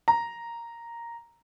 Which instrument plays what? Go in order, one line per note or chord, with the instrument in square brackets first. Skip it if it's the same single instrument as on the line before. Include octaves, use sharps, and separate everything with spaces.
[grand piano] A#5